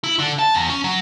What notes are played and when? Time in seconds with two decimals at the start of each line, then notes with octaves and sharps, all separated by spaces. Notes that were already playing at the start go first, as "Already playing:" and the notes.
0.04 E4
0.19 D3
0.39 A5
0.54 E2
0.70 C#4
0.84 F#3